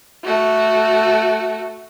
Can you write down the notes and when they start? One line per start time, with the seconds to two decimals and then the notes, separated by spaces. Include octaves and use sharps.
0.24 A3 F#4